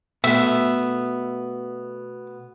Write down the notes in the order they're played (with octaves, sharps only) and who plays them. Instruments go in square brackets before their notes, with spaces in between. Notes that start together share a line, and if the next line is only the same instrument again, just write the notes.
[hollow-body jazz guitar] B2 A3 B3 [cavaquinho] E5